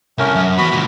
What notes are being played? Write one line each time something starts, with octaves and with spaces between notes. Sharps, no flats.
C2 A3 C#4 A#4
F#2
E2 B3 F#4 B5
C#2 A#2